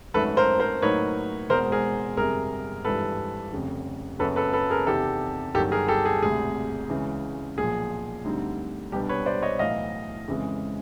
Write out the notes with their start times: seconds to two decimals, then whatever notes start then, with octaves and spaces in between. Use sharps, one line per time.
0.14 G#1 F#2 D#3 F#3 A3 A4 B4
0.37 A#4 C5
0.60 A#4 C5
0.82 A2 F#3 A#3 D#4 B4 C#5
1.49 E1 E2 B2 G#3 A#4 C5
1.72 G#4 A#4
2.16 G1 F2 C3 G#4 A#4
2.85 G#1 G2 E3 G3 A4 B4
3.53 F1 F2 C#3
4.19 F#1 F#2 C#3 F#3 B3 A4 B4
4.36 A4 B4
4.53 A4 B4
4.70 G#4 A#4
4.87 E2 C3 D#3 G4 A4
5.54 G1 G2 D#3 F#3 A#3 G4 A4
5.72 G#4 A#4
5.88 G4 A4
6.05 G#4
6.22 E1 D2 C3 G#4
6.90 C#2 C#3 E3
7.58 B1 A#2 F3 G#4
8.24 D2 D3 G3 C4 D#4
8.92 C2 B2 G3 B3 D4 G4
9.09 B4 C#5
9.26 C5 D5
9.42 C#5 D#5
9.59 B1 A2 E3 D#5 F5
10.27 F2 C#3 E3 G#3